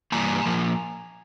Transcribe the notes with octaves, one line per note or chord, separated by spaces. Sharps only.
G2 E3 G3 A#3 G#5 A#5
A#2 F3 A#3